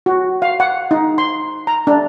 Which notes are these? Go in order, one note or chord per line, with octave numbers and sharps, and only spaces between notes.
F#4
F5
F#5
D#4
C6
A#5
D4